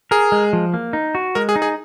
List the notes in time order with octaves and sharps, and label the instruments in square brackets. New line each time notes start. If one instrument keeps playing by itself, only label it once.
[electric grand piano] G#4 [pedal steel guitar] A#4
[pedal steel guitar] G#3
F3
A#3
D#4
F#4
[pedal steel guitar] G#3 [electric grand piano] A#4
[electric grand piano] G#4
[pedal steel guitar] D#4
[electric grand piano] G#4